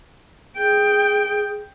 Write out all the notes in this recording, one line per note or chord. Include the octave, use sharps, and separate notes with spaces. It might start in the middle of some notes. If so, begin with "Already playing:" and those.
G#4 G5